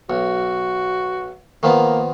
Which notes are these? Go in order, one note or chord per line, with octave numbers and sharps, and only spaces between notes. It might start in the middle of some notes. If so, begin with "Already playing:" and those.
B1 F#4
D#3 F3 A#3 B3